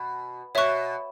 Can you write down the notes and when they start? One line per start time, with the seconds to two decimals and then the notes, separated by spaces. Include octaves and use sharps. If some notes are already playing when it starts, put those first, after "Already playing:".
Already playing: B2
0.55 B2 C#5 E5 C#6 F#6